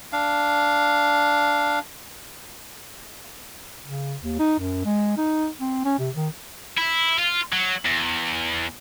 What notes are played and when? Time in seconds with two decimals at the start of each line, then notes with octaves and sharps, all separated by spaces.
0.13 D4 F5
3.84 C#3
4.22 D#2
4.39 D#4
4.59 F#2
4.85 G#3
5.17 D#4
5.60 C4
5.85 C#4
5.99 C3
6.16 D#3
6.78 E4
7.19 F4
7.53 F#3
7.85 E2